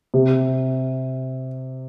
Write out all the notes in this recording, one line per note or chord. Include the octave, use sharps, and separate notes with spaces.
C3